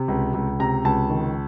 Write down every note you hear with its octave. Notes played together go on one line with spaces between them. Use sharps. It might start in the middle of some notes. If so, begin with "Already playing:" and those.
Already playing: C3
C#2
C#2
C3 A#5
C#2 A5
D#3